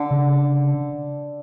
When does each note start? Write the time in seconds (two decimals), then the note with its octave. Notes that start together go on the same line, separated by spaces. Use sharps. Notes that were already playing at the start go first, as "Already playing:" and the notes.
Already playing: D3
0.11 C#3